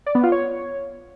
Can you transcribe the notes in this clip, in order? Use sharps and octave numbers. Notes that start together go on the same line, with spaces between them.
D5
B3
F4
C#5